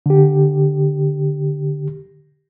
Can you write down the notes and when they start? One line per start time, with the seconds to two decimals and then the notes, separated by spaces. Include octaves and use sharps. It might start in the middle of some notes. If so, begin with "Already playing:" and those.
0.06 D3 G4